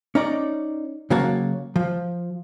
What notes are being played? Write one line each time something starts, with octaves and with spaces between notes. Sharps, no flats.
C#4 D#4 D5
C#3 F#3 A#3 F#4 C#5 A5
F3